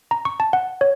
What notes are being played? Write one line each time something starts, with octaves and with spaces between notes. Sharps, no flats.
A#5
C#6
A5
F#5
C#5